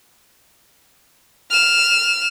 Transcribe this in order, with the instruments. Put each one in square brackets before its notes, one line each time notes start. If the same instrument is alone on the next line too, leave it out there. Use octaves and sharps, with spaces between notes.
[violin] F6 E7